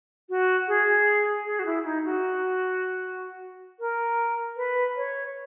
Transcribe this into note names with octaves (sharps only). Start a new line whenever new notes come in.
F#4
G#4
G#4
F#4
E4
D#4
F#4
A#4
B4
C#5